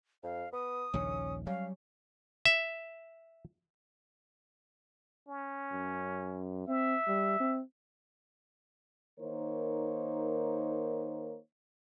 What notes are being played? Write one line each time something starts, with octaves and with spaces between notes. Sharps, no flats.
F2 F5
B3 D#6
A#1 D#2 C#3 C#4
F#3 G3 C#4 F5
E5
C#4
F#2
C4 E5
G3
C4
D#3 A#3 D#4 A#4 C5 C#5